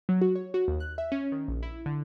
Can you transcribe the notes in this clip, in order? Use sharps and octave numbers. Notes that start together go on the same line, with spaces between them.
F#3
F#4
C#5
F#4
D#2
F#6
E5
C#4
D#3
A#1
E4
D3